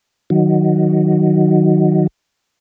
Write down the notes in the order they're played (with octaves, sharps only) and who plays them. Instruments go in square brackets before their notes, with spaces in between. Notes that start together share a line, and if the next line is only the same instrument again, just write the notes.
[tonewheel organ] D#3 F#3